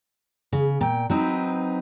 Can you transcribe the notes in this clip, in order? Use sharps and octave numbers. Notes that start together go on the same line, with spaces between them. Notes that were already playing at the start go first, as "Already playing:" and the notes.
C#3
A#2 G5
F#3 C4 D#4 B4